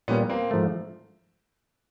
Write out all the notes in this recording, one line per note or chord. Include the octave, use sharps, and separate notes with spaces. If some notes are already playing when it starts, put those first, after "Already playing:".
A#2 G3 A#3 B3 C#4
A#3 C4
G#2 F3 A3